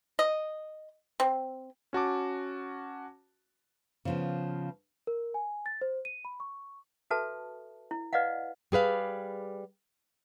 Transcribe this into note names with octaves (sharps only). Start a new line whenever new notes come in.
D#5
C4
C#4 F#4 A5 D6
C#3 F3 B3
A#4
G#5
A6
C5
D#7
B5
C#6
F#4 A4 B4 E5 A5
E4
B4 D5 D#5 F5 F#5
G3 G#4 B4 F5